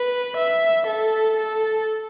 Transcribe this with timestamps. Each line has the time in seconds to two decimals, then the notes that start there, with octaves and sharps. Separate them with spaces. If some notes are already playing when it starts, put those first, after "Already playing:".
Already playing: B4
0.38 E5
0.87 A4
1.36 A4